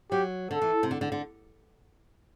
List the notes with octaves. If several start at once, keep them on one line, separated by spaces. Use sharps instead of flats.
F#3 G4
D3 A4
E3
C3
D3
D3
D3